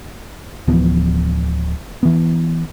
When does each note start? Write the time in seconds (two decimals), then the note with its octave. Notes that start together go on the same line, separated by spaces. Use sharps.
0.68 D1 E3 F3 B3
2.03 E3 B3